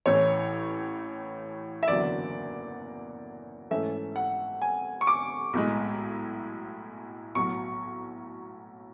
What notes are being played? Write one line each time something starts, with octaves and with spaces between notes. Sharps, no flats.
A1 A2 E3 C#5
E5
F#1 E2 D3 F#3 D5
G#2 E3 A3 C#4 E5
F#5
G#5
C#6
D6
B1 A2 G#3
B1 A2 F#3 C#6